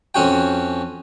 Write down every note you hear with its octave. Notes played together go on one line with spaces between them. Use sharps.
F2 C#4 F#4 G5